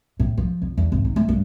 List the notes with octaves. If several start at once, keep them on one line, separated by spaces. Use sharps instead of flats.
A2
F3
F2
E2
G#1
D#4
A3
G2